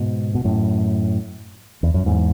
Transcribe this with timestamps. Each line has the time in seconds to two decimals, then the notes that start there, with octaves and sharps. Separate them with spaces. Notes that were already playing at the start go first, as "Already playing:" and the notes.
Already playing: G#2 B2
0.35 B2
0.44 F#2 A2
1.83 E2
1.94 F#2
2.06 E2 G#2